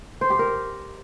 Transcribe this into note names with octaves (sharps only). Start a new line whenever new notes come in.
C5
G4
A#4